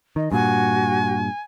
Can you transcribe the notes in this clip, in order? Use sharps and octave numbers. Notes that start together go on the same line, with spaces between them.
D#3 D#5
G2 A#2 F#4 G#5